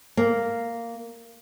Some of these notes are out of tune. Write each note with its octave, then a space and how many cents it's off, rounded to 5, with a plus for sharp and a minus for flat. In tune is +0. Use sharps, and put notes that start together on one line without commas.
A#3 -5